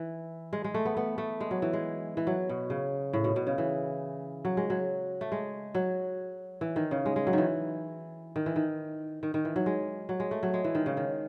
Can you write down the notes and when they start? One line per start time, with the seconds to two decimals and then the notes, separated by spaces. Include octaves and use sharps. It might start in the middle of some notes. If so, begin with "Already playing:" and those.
Already playing: E3
0.53 G#3
0.64 G#3
0.74 A3
0.85 B3
0.97 B3
1.18 A3
1.41 G#3
1.51 F#3
1.62 E3
1.73 G#3
2.17 E3
2.27 F#3
2.49 B2
2.70 C#3
3.13 A2
3.24 B2
3.36 B2
3.47 C#3
3.58 E3
4.45 F#3
4.57 G#3
4.70 F#3
5.21 A3
5.32 G#3
5.75 F#3
6.61 E3
6.76 D#3
6.91 C#3
7.06 G#3
7.16 G#3
7.27 F#3
7.33 D#3 E3
8.36 D#3
8.46 E3
8.56 D#3
9.23 D#3
9.34 D#3
9.45 E3
9.56 F#3
9.66 G#3
10.09 F#3
10.20 G#3
10.31 A3
10.43 F#3
10.54 G#3
10.64 E3
10.75 D#3
10.86 C#3
10.97 D#3